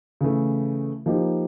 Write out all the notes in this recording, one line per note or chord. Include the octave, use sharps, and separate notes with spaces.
C#3 E3 A3
F3 A#3 D#4 G4